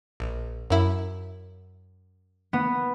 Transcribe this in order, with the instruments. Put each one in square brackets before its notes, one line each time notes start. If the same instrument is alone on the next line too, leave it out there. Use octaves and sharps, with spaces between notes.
[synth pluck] A#1
F#2 E4
[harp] B3